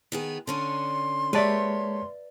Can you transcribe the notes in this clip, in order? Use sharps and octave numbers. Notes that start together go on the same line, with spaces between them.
D#3 B3 G#4
D3 C#4 D4 C6
G#3 A#3 G4 B4 C#5 D5 E5 A5